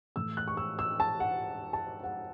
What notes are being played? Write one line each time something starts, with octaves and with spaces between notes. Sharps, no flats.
A2 E3 A3 E6
F#6
C#6
E6
E6
A5
F#5
A5
F#5